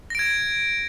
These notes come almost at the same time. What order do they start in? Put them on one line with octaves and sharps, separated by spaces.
A#6 D7 G#6